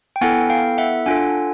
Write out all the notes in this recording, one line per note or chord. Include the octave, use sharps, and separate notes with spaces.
G5
B3 E4 A4 F#5 G#5
F5 G5
E5 F#5
D4 F4 A4 F#5 G#5